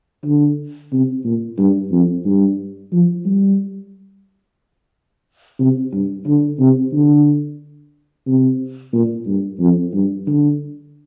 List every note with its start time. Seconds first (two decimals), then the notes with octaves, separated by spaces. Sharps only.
0.25 D3
0.92 C3
1.25 A#2
1.58 G2
1.92 F2
2.25 G2
2.92 F3
3.25 G3
5.59 C3
5.93 G2
6.26 D3
6.60 C3
6.93 D3
8.27 C3
8.93 A#2
9.26 G2
9.60 F2
9.93 G2
10.27 D3